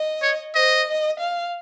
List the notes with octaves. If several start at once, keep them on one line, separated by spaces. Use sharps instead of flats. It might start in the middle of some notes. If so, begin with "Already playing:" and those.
Already playing: D#5
C#5
C5 D#5
D#5
F5